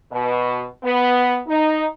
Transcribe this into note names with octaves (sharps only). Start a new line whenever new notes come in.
B2
B3
D#4